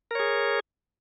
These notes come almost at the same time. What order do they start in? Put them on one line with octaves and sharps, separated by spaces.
A#4 C#5 G#4